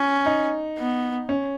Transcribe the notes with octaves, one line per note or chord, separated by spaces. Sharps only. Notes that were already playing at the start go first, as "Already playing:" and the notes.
Already playing: C#4
D#4
B3
C#4